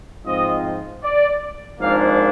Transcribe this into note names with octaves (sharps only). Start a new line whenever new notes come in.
G#2 F3 C4 F4 D#5
D5
G#1 G#2 F3 A#3 D4 F5